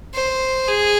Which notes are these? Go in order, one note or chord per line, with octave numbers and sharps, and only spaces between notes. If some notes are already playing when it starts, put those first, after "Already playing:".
C5
G#4